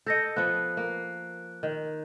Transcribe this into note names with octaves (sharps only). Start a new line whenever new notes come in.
A4 D#5 G6 A#6 C#7
F3 B3 F#6
A#3
D#3